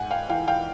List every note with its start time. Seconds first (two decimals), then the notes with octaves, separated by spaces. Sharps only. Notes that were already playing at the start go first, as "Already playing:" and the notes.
Already playing: G#2 F#5 G#5
0.11 F5 G5
0.29 E3 F5 G5
0.48 F5 G5